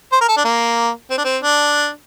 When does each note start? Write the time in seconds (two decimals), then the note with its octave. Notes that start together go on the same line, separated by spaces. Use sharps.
0.12 C5
0.21 A#4
0.28 A4
0.37 D4
0.45 A#3
1.10 C4
1.18 D4
1.24 C4
1.43 D4